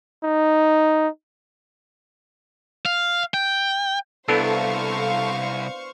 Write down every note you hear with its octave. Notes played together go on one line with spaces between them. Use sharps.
D#4
F5
G5
C2 B3 D4 E4 A4 C5 F5 C#6